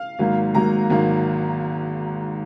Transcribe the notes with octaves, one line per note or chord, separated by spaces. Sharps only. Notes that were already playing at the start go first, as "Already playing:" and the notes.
Already playing: F5
G#1 G#2 F#3 A#3
G#1 G#2 F#3 A#3 A#5
G#1 G#2 F#3 A#3